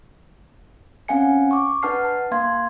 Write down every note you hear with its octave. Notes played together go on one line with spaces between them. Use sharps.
C4 C#4 F5 F#5 G#5 C#7
C#6 D6
D4 B4 F#5 A5 F6 C7
A5
A#3 F5 C6 G#6